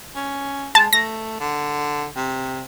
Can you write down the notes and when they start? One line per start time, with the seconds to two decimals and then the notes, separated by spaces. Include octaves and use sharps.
0.15 C#4
0.75 G#3 A5
0.93 A3 A#6
1.40 D3
2.16 C3